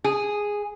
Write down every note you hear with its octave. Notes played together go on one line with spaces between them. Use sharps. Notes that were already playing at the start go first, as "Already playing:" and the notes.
G#4